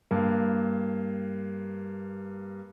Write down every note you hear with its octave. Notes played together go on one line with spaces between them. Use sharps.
G2 A#3